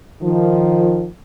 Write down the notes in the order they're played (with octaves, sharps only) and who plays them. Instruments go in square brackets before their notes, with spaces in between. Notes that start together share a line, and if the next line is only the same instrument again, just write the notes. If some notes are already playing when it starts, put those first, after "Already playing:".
[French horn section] D#3 F3